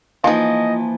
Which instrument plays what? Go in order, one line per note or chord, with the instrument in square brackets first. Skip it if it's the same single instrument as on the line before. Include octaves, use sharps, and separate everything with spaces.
[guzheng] E3 F3 [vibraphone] A#3 [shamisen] D#4 F4 [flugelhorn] D#5